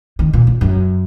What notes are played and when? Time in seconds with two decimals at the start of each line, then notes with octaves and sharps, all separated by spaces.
0.19 D#3
0.33 A#2
0.47 C#3
0.61 F#2